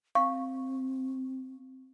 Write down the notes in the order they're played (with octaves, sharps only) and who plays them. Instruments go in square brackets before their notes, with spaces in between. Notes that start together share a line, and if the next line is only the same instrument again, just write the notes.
[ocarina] C4 [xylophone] F5 C#6